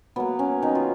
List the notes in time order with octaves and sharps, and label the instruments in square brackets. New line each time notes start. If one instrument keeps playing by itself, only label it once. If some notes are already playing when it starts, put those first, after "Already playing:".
[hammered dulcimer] F#3 A#3 B3
C#4
D#3 D#4
F4